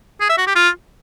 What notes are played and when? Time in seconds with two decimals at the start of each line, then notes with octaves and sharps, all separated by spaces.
0.21 G#4
0.29 E5
0.38 F#4
0.47 G4
0.55 F4